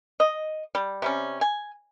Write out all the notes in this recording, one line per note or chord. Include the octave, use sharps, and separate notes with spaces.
D#5
G3
C3 G3 C#4
G#5